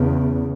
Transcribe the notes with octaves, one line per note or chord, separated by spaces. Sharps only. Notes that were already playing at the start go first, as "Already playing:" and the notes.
Already playing: E2 C#3